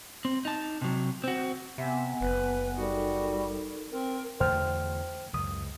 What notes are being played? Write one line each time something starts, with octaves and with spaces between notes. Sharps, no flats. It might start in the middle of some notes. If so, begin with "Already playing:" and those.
C4
D#4 A5
C3 F#3
C4 F#4
C3 B3 E5 F#5 G#5
F#1 B4
G3 D#4 F#4 A4 A#4
C4 A#4
E2 D3 A3 C5 G5 F6
C#2 F#2 D#6